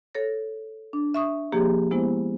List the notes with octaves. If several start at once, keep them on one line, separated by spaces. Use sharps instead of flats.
A4 C#5 A#6
D4
E5 C#6 D#6
C3 F3 A#3 G4 G#4
G#3 B3 E4 C5